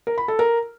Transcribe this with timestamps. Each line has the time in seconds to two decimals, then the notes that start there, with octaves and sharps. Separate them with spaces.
0.07 A#4
0.18 B5
0.28 A4
0.39 A#4